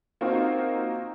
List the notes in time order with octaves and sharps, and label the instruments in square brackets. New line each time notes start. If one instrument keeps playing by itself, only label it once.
[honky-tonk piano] A#3 C4 D#4 F4 F#4 A#4